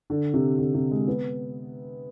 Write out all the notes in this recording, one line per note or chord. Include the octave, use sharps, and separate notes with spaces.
D3
C3
D3
C3
G#3
B3